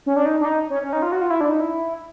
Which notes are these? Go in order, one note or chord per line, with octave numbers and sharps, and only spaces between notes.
C#4
D4
D#4
D4
D#4
C#4
C#4
D#4
F4
F#4
F4
E4
D4
D#4
E4